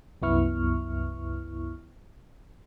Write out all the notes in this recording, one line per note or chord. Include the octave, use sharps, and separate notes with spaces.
C2 F#2 B3 E4 C#6 F6